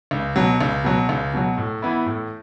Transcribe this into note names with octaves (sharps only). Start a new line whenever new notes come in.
C#2
B2 F#3
C#2
B2 F#3
C#2
B2 F#3
A2
E3 B3 E4
A2